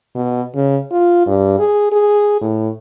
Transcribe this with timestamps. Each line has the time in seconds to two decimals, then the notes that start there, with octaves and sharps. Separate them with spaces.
0.15 B2
0.55 C#3
0.91 F4
1.26 G2
1.59 G#4
1.92 G#4
2.42 A2